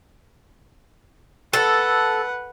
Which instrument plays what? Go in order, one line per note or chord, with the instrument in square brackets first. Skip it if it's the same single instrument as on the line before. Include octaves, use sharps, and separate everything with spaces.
[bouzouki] A4 [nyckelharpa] B4 F#5